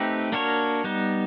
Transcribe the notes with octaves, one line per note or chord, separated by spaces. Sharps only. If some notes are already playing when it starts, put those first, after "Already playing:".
Already playing: A3 C4 D#4 G4 B4
A#3 D4 F#4 A#4 C#5
G3 B3 D#4